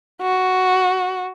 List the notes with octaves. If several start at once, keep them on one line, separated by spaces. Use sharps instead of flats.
F#4